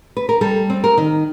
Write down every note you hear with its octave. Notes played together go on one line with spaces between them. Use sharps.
B4
A#4
G3 A4
C4
A#4
D#3